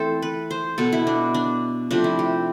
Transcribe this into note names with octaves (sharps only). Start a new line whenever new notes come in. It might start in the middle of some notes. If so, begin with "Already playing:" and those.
Already playing: E3 A3 C4 A4 C5
B4
C5
B2 B3 A4
E4
D4
D4
C3 F3 A3 D4
E4
G4